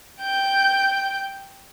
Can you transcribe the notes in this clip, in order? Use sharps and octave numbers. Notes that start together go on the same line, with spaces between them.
G5 G6